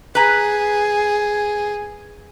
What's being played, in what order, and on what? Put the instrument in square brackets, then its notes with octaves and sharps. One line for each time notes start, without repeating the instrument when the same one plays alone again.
[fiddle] G#4 [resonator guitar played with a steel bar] B4 A#5